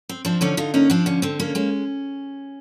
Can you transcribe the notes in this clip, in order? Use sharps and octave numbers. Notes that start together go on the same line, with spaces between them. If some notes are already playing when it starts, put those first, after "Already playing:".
C4
F3 C4 D4
D3 C#4 D#4
D3 D#4 F4
A#3 C#4 D#4
F3 C4 D4
D3 C#4
D3 C4
A#3 C#4
G#3 C#4